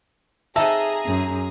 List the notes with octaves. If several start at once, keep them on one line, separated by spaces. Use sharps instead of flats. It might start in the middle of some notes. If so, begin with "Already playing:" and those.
C3 D#4 G#4 A4 E5 A#5
F#2